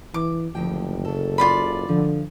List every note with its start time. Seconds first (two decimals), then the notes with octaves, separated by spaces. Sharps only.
0.14 E3 D6
0.55 F#1 D2 F3 G5
1.05 C#3 A4
1.38 F4 D5 B5
1.88 D3 F3